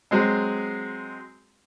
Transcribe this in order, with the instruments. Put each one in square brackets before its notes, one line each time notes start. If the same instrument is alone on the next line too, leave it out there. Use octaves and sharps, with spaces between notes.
[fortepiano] F#3 G#3 C4